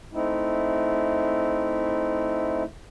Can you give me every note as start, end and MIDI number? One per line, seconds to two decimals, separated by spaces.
0.14 2.63 57
0.14 2.63 60
0.14 2.63 63
0.14 2.63 64